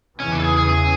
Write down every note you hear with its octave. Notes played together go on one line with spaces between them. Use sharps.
E2 C#3 E3 C#4
D4
A4
G#4
G#4
G#4